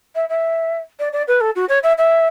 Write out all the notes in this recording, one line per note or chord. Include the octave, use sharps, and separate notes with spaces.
E5
E5
D5
D5
B4
A4
F#4
C#5
E5
E5